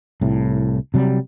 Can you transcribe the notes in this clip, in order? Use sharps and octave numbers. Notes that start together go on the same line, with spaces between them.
C2 A2
C3 F#3 G3